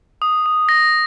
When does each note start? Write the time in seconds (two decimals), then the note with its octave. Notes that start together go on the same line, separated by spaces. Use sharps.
0.22 D#6
0.46 D#6
0.69 A#6